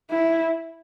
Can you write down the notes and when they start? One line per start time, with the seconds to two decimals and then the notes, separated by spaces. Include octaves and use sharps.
0.11 E4